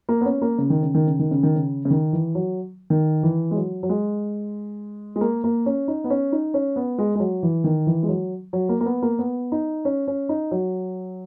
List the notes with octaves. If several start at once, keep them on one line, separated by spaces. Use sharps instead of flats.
A#3
B3
C#4
A#3
C#3
D#3
C#3
D#3
C#3
D#3
C#3
D#3
C#3
C#3
D#3
E3
F#3
D#3
E3
G#3
F#3
F#3
G#3
G#3
A#3
A#3
C#4
D#4
B3
C#4
D#4
C#4
B3
G#3
G#3
F#3
E3
D#3
E3
G#3
F#3
F#3
A#3
A#3
B3
A#3
B3
D#4
C#4
C#4
D#4
F#3